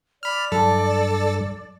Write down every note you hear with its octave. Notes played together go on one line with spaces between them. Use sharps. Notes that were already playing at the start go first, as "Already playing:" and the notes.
D5 B5 F6
G2 F#3 A4 A5